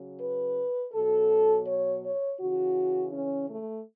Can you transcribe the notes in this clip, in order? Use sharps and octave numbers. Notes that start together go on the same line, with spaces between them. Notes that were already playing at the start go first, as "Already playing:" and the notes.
Already playing: C#3 F#3
B4
B2 F#3 A4
C#5
C#5
C#3 E3 F#4
C#4
A3